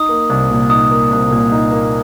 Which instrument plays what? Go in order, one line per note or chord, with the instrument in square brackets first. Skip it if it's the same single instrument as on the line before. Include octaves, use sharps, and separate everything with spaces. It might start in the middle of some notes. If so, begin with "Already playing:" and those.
Already playing: [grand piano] D#4 [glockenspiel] D#6
[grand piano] A#3
C2
A#2
[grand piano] D#4 [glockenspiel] D#6
[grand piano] A#3
C2
A#2
D#4
A#3